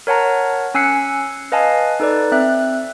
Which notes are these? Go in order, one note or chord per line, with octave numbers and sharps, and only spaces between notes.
A#4 C#5 F#5 A5 A#5
C#4 G#5 E6 F#6 C7 C#7
B4 D#5 F5 G#5 A5
D#4 A4 B4 D5
C4 E5 F#6